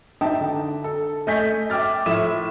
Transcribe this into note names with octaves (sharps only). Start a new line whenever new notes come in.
D#4 E5 G5 A5
D3
A4
A3 D#5 G#5 G6 B6
E5 G5 D6 F6 A6
A2 F3 E5 E7